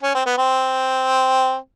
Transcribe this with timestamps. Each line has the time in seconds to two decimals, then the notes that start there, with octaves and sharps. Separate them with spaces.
0.02 C#4
0.15 C4
0.26 B3
0.38 C4